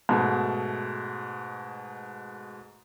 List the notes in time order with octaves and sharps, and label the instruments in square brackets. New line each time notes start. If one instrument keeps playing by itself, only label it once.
[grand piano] G#2 B2 A3